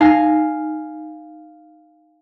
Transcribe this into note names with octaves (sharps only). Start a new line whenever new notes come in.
D#4 F5 G#5 A#6